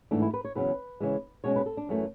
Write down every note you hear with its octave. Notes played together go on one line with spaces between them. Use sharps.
G#2 E3 A3 D4
E4
B4
C#5
E2 C#3 F#3 B3 B4
C#3 E3 G#3
B2 G#3 C#4 C#5
B4
A4
D4
F#2 E3 A3